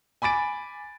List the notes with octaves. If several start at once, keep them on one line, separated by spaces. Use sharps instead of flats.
G#5 B5 D6 A6 D7